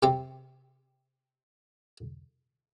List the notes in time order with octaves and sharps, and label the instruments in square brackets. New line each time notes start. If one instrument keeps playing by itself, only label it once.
[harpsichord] C3 C4 G4